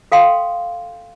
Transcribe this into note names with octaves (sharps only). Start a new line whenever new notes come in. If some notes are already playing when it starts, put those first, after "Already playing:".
A4 F5 G5 C6